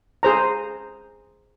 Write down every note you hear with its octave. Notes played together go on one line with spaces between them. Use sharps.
G#4 C5 A#5